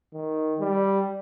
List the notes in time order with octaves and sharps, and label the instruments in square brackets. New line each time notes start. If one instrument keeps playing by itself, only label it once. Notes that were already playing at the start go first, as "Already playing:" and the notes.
[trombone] D#3
G3